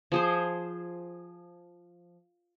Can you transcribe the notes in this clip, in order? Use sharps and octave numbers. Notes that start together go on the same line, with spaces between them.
F3 G#4 C5